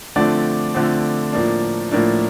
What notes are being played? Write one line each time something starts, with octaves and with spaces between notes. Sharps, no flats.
D3 F3 A3 C4 D4 D5
D3 F3 A3 C4
A2 F3 A#3 D4
A2 F3 A#3 D4